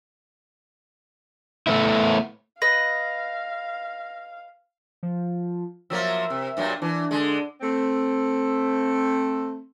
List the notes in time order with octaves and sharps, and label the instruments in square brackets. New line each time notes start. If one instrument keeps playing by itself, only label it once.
[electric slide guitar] A3 B3 E4
[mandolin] B4 D#5 [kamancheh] F5 [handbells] A#6
[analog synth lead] F3
[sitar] F3 F#3 A#3 [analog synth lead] E5
[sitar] C3
G2 A#2 F#3
[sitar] E3 [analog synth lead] D4
[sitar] D3 G#3
[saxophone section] A3 C4